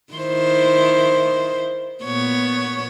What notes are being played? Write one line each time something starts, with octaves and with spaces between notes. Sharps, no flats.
D#3 E4 C5
A#2 B3 C#5